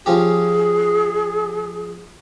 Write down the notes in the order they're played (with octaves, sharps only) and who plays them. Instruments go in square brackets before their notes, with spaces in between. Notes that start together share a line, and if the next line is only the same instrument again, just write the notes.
[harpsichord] F3 C#4 G4 [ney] G#4